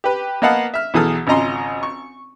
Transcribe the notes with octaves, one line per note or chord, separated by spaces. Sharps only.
G4 B4
A#3 B3 D#5 F5 F#5 A5
E5 F6
B1 E3 G#4 A4 D#6 F6
G#1 C#3 F4 D#5 A#5 C6
C#6